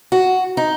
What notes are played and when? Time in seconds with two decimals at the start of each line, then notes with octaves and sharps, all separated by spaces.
0.12 F#4
0.57 D#4